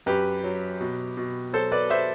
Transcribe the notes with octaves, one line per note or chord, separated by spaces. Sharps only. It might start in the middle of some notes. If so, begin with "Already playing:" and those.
F#2 G4 B4
F#3
B2
B2
F#3 A4 C5
B4 D5
C5 E5